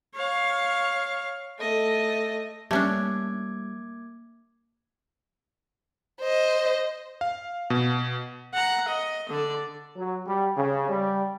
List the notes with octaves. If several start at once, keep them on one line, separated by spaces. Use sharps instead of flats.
C#5 F5
A3 D#5
G3 A3 A#3 C#4 D4 D6 G#6
C5 D#5
F5
B2
F#5 A#5
D#5
D3 D5
F#3
G3
C#3
G3